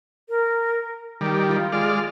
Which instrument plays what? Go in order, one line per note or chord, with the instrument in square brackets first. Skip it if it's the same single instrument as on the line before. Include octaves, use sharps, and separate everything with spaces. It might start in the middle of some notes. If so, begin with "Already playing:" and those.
[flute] A#4
[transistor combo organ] D#3 G3 [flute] G4
[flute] F4
[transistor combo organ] G#3 D5 F6